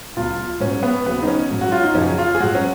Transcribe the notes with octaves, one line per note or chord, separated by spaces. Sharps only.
C#2 B2 F#3 F4
G#2 F#3 C#4
B3
D#2 C#3 F#3 B3
D#4
C#4
G#2 F#3
F#4
F4
D#4
F#2 C#3 F3 C#4
F4
G#4
G#2 F#3 F#4
C#4